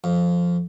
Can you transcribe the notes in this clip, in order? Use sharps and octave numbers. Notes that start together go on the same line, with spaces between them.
F2